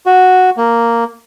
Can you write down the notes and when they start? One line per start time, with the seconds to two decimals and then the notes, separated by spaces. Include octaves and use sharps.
0.06 F#4
0.57 A#3